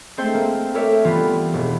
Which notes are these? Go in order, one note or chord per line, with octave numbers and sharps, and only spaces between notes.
G#3 A3 C4 C5
A#3
A4 A#4 C#5 D5 E5
E3 G3 B3 F4
E1